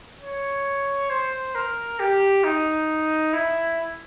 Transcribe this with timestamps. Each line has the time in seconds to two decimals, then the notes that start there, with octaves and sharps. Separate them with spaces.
0.21 C#5
1.10 C5
1.55 A#4
1.99 G4
2.44 D#4
3.33 E4